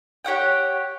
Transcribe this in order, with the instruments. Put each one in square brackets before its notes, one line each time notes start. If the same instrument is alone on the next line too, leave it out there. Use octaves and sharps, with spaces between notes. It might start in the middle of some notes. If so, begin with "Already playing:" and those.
[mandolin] G4 C#5 F#5 G5